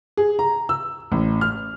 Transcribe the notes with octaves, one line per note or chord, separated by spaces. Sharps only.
G#4
A#5
E6
A1
F6